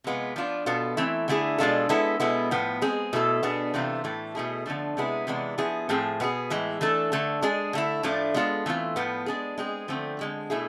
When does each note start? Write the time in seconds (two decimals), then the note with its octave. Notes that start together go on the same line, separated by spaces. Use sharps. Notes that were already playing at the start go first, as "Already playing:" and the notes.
0.04 C3 G#3 B3 F4
0.36 F3 B3 D4 F4
0.66 B2 B3 F4 A4
0.97 E3 A3 C4 E4
1.28 D3 A3 E4 G#4
1.58 B2 G#3 D4 F4 A4
1.89 G#3 B3 E4 A4
2.20 B2 G#3 B3 E4
2.51 A2 F3 B3
2.82 G#3 C4 G#4
3.13 B2 A3 E4 A4
3.43 B2 B3 D4 G#4
3.74 C3 E3 A3 C4 F4
4.04 A2 E3 A3
4.35 B2 A3 E4 G#4
4.66 D3 F3 A3 D4
4.97 C3 G#3 B3 E4 G#4
5.27 C3 E3 G#3 B3 D4
5.58 F3 B3 E4 G#4
5.89 A2 F3 A3 C4 G#4
6.20 B2 B3 F4 G#4
6.50 A2 E3 G#3
6.81 E3 A3 D4 A4
7.12 D3 A3 D4
7.42 G#3 D4 G#4
7.73 D3 A3 E4
8.03 A2 F3 A3 D4
8.34 G#3 B3 F4 A4
8.66 E3 A3 C4 F4
8.96 A2 F3 B3
9.26 G#3 D4 G#4
9.58 G#3 C4 G#4
9.88 D3 F3 A3 C4
10.19 D3 G#3 C4
10.50 B2 A3 E4 G#4